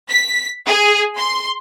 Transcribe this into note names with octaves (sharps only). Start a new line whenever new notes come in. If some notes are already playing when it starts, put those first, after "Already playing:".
B6
G#4
C6